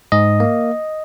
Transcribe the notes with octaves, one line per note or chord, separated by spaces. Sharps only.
G#2 D#5
A#3